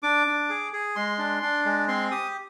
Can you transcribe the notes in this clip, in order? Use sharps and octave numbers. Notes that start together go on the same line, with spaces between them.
D4 D6
D4
G#4
G#4
G#3 C6
D4
D4
G#3
C4 C6
G4 D#6